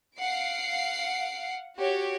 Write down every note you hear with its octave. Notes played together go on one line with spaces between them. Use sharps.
F5 F#5 C7 D7
F#4 G4 C#5